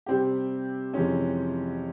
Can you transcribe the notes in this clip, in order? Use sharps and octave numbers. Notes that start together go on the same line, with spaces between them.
C3 G3 C4 G4
F2 C3 E3 G#3 C#4